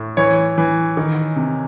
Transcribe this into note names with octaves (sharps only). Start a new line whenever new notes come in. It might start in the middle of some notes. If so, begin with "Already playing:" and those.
Already playing: A2
E3 C#5
E3
D#3
C3